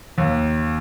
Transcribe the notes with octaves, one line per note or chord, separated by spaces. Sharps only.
D#2